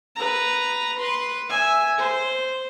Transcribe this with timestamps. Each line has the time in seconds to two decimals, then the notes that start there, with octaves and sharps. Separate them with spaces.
0.16 B4 A#5
0.99 B4 C6
1.50 E5 G#5
1.98 C5